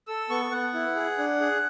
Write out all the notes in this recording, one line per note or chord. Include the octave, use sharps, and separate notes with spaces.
A4 E6
B3 C#6
B3 F#5
E4
G#4
D4
G#4